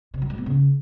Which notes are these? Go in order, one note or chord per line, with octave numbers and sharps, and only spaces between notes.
C3
F#3
G#3
B3
C#3